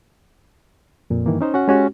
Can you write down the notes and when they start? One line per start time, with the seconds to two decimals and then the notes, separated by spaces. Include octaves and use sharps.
1.10 F2 A#2
1.26 G2 D#3 E3 A#3
1.41 C#4 D#4 C5
1.54 C#4 F#4 F#5
1.68 G#3 C#4 F#4 G4